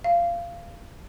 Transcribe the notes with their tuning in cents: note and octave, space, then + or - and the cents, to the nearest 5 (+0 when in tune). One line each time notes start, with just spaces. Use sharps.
F5 -20